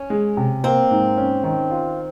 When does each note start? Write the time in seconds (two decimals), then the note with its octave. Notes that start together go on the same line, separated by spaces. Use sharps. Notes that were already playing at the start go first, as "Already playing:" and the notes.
Already playing: C#4
0.10 G#3
0.37 C3
0.64 A#3 C4
0.91 G#2
1.17 C#4
1.44 D#3
1.71 F4